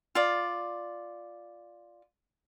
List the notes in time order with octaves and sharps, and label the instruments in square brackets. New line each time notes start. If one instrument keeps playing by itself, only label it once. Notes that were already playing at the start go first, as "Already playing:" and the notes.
[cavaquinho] F4 D5